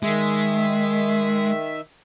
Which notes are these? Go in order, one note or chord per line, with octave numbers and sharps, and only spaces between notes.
D#3 G#3 E5